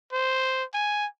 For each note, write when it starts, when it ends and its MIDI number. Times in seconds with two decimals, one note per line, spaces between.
0.12 0.64 72
0.74 1.06 80